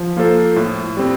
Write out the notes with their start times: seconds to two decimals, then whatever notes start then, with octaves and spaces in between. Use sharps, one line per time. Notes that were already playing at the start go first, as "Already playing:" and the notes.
Already playing: F3
0.17 A#3 F4 A4 C5
0.56 A2
0.97 G3 C4